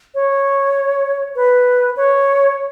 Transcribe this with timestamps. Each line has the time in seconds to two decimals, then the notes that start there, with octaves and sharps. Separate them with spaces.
0.15 C#5
1.36 B4
1.97 C#5